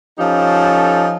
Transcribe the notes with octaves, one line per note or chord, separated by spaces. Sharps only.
F3 C#4 D#4 G4 A4